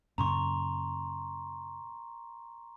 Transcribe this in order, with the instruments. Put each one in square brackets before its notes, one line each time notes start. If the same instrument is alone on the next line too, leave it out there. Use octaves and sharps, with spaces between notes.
[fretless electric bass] F#2 A#2 C#3 [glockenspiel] A#5 C6 C#6